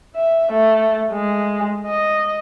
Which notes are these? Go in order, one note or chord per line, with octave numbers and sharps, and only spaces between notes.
E5
A3
G#3
D#5